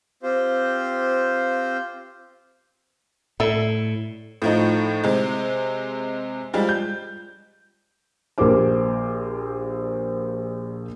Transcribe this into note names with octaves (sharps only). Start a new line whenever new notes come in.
C4 F4 G4 C5
A2 A4 D5 E5
A2 F3 D#4
C3 G#3
F3 G3 G#3
G6
A#1 A#2 G4 A#4 C5 D6